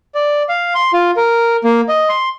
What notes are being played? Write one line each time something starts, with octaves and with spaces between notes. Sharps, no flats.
D5
F5
C6
F4
A#4
A#3
D#5
C6